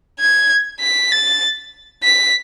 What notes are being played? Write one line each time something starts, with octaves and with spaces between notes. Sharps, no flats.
G#6
B6
A6
B6